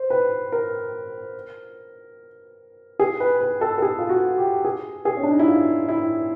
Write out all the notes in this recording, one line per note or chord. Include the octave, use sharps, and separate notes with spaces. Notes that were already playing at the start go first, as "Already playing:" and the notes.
Already playing: C5
B4
A#4
G#4
B4
B4
A4
A4
G#4
F4
F#4
G4
G#4
G#4
C#4
D4
D#4
E4
F4
E4